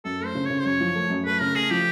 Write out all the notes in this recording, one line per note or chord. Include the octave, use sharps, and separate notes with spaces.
F#2 A4
A3 C5
C#3
C#3 C#5
C5
F#2 C#5
F3
A3
F#2
A3 B4
C#3 A#4
A3 G#4
F3 G4